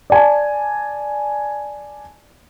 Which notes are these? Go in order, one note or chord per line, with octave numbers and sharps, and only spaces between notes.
D5 G#5 A5